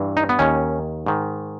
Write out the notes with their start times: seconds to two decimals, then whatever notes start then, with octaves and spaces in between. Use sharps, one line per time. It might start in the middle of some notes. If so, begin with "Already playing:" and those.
Already playing: G2 E3
0.17 D#4
0.29 B3
0.39 D#2 D#3 C#4
1.06 G#2 D#3